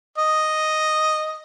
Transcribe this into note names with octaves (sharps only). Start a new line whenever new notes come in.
D#5